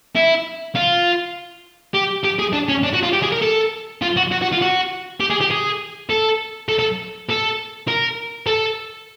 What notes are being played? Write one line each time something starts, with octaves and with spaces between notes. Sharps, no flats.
E4
F4
G4
G4
G#4
D4
C#4
D4
F#4
F4
G4
G#4
A#4
A4
F4
F#4
F#4
F#4
F4
F#4
G4
G#4
G4
G#4
A4
A4
A4
A4
A#4
A4